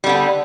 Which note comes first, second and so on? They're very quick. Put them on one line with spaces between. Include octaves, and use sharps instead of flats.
G3 D3 B3